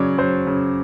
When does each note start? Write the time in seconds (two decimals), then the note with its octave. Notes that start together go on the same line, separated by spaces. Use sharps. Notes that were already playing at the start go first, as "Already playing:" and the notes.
Already playing: C#3 F#3 C#5 D5
0.18 F#3 C5
0.47 C#3